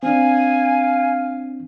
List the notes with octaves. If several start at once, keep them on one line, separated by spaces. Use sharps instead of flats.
C4 D4 F5 G#5